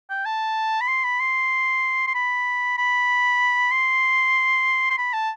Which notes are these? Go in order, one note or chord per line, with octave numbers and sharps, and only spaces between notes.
G5
A5
B5
C6
B5
C6
C6
B5
B5
C6
C6
B5
A5